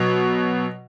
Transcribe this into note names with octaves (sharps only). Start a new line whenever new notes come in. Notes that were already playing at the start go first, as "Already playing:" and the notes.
Already playing: B2 F#3